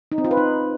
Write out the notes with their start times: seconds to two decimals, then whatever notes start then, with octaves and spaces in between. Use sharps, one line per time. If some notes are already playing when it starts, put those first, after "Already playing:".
0.12 D#4
0.18 C4
0.24 F4
0.31 B4
0.37 D#4